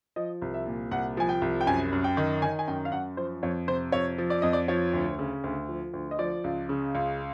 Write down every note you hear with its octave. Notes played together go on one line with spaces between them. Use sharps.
F3 D#5
C2
E5
A#2
C2 F#5
F3 G#5
G5
C2
G5
F#2 G#5
F#2
G5
D#3
D#3 G#5
G#5
F#2 G5
F5
F#2 F#5
F3 C5
F2 C#5
C3 C5
F2 C#5
F3
D5
F2 D#5
D5
F3 C#5
D2
C#3
D2
F3
D2
D#5
F3 D5
C#2
C#3
C#2